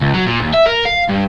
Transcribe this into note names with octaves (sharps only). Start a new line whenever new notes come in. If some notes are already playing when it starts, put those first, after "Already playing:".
C#2
F#3
A#2
D#2
E5
A#4
F5
G2